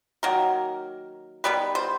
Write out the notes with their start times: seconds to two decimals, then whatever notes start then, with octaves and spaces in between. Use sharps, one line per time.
0.23 D#3 F#3 A#3 A#4
1.44 D#3 G3 B3 B4
1.75 C5